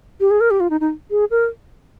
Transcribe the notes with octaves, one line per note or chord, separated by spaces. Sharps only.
G4
G#4
A#4
G4
F4
D#4
D#4
G#4
A#4